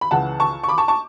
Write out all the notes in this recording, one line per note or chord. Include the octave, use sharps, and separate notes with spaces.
B5
C#2 C#3 E3 F#5 A5
A5 C#6
C#6
B5 D6
A5 C#6
A5 C#6